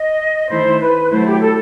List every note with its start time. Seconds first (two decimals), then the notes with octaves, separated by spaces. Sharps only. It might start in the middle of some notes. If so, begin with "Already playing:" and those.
Already playing: D#5
0.49 D#3 A3 E4 C5
0.80 B4
1.10 F#3 A3 E4 C5
1.25 G4
1.40 A4